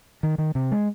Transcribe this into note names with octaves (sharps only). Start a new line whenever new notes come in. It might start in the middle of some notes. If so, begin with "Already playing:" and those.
D#3
D#3
C3
G#3